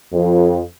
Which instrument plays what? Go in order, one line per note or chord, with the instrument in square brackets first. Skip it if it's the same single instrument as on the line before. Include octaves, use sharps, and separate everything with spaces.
[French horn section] F2